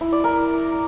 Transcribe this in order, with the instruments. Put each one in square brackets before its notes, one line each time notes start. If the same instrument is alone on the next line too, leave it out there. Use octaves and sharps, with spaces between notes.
[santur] E4
D5
A#4